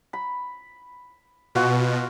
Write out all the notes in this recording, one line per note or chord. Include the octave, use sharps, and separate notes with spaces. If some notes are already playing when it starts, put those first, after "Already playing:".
B5
B2 F4 F#4